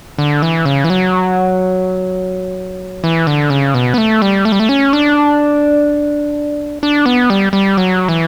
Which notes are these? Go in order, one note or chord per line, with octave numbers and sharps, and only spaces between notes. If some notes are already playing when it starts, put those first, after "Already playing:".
D3
E3
C#3
E3
F#3
E3
D3
C#3
B2
B3
A3
G3
A3
G3
A3
C#4
D4
D4
B3
G3
G3
F#3
E3